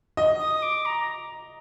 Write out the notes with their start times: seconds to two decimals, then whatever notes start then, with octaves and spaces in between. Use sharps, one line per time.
0.17 D#5
0.39 D#6
0.62 D6
0.85 A#5